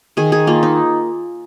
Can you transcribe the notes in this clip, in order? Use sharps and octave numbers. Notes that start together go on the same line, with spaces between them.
D#3 G#4
G#4
A#3 F4
D#4